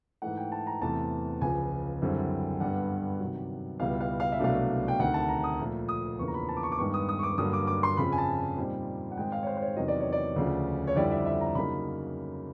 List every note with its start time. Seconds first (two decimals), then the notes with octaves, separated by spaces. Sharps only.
0.22 G#2 E3 A3 F#5
0.37 G5
0.52 A5
0.67 A#5
0.81 E2 C3 E3 A3 A5
1.41 C#2 C#3 F3 G#5
2.02 F#2 D3 G3 C4 E4
2.60 G2 D3 G3 B3 F#5
3.20 C3 D#3 F#3
3.80 C#2 B2 G3 B3 E4 F5
4.00 F5
4.20 F5
4.32 E5
4.39 C2 B2 F#3 A3 D4 F5
4.88 G5
4.99 D2 C3 D#3 F#5
5.14 A5
5.29 A#5
5.44 D#6
5.59 A#2 F3 A3
5.89 D#6
6.18 E2 C#3 F3 A#3 D4 C#6
6.28 A#5
6.34 B5
6.49 A5
6.57 D6
6.63 C#6
6.72 D6
6.78 G2 D#3 G#3 B3 C#6
6.94 D#6
7.09 D#6
7.19 C#6
7.23 D6
7.38 G2 D3 F#3 A#3 D#6
7.53 D6
7.67 D6
7.83 C6
7.97 F2 C#3 F3 B5
8.12 G#5
8.18 A5
8.57 A#2 G3 C4 D#4
9.12 F#5
9.17 G#2 D#3 G#3 C4 G5
9.32 F5
9.43 C#5
9.47 C5
9.57 C5
9.62 C#5
9.76 E2 C3 D#3 F#3 D#5
9.88 D5
10.00 C#5
10.12 D5
10.36 D2 C#3 F3
10.87 C#5
10.96 F2 D3 G3 C4 E4 D5
11.11 E5
11.26 E5
11.41 A#5
11.55 C#3 F#3 A#3 D#4 B5